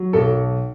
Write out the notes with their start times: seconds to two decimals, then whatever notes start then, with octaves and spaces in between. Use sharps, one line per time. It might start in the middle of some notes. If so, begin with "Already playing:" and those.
Already playing: F#3
0.13 B1 A4